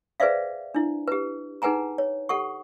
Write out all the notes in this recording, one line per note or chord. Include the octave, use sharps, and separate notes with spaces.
G#4 B4 C5 D5 E5 F5
D4 E4
G4 B4
D#4 G#4 B4 F#5 G#5 A#5
C#5
G4 A4 F#5 C#6